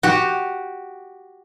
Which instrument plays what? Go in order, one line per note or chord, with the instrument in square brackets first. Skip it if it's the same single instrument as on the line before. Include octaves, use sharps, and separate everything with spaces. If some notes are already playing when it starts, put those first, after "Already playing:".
[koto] F#4 G4